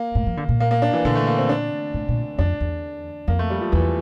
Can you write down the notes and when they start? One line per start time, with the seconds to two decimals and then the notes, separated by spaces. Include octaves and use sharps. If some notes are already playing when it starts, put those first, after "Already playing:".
Already playing: A#3
0.15 A2
0.27 F3
0.37 D3
0.49 A#2
0.60 A#3
0.71 A#3
0.82 D4
0.93 E3
1.04 A#2 D3
1.15 A3
1.27 A#3
1.38 C4
1.49 D4
1.94 A2
2.08 A#2
2.38 F2 D4
2.60 E2
3.28 F2 A#3
3.39 A3
3.50 G3
3.61 F3
3.72 E2 E3